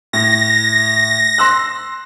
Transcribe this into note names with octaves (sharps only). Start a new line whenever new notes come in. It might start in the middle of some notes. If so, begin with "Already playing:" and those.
A2 A#6
C6 E6 F#6